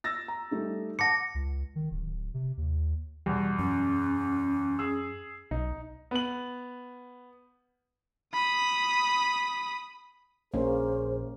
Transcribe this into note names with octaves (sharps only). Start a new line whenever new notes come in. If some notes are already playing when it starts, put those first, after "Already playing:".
E6 A6 A#6
A#5
G3 A3 D#4
F#5 A5 D6 A#6 C#7
C#2
D#3
D1
C3
D#2
E2 B2 G3
F#2 C#4
G#4 E6
B1 D#4
B3 F#7
B5 D#6
A#1 A#3 C#4 G#4 C5